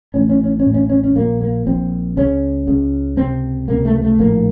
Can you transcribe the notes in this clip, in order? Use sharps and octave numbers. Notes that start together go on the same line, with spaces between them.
A1 A2 C#4
C#4
C#4
C#4
A1 A2
C#4
C#4
C#4
A#1 A#2 A#3
A#3
A#1 A#2 C4
C#2 C#3 C#4
C#2 C#3
C#2 C3 C4
C#2 C3 A#3
A3
A#3
A3
A#1 A2 A#3